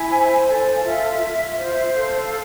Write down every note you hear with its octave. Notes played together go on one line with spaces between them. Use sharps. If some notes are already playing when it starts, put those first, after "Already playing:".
Already playing: E4 G#5
C5
A4
F5
F4 E5
F4
C5 E5
F5
E5
E5
A4 F5